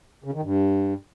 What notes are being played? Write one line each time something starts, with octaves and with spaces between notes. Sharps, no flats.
C#3
D#3
G2